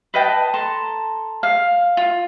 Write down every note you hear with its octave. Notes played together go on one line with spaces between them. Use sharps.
B4 D#5 G5 A5
A4 A5 A#5 C6
F5
F4